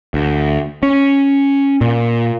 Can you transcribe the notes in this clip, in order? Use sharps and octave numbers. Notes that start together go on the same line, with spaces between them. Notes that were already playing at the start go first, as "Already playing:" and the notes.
D2
C#4
A#2